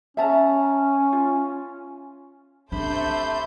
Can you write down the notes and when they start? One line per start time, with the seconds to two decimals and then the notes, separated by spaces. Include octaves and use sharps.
0.17 C#4 E5 A5 A#5
1.13 F4
2.72 C3 A3 D4 C5 B5 G6